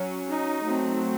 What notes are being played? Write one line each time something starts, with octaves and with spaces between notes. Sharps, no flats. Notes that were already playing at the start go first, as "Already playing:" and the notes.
Already playing: F#3 C#4
D#4
F#3 A3 C4